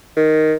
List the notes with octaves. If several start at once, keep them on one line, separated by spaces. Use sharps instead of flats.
D#3